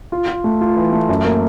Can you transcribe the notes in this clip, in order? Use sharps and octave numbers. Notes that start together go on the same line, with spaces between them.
F4
F4
A3
F4
E3
A3
F#2
A#3